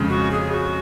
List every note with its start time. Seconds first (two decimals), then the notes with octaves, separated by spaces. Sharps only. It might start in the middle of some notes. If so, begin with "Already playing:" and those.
Already playing: F2 C#3 G#3
0.09 F#4
0.31 G#4
0.52 F#4